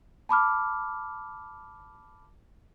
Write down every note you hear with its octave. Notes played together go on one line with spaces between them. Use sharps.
A5 B5 D6 F6